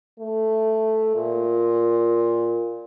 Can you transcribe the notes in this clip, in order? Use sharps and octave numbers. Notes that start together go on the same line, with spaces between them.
A3
A#2